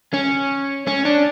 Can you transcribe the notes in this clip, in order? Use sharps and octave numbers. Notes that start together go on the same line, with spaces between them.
C#4
C#4
D4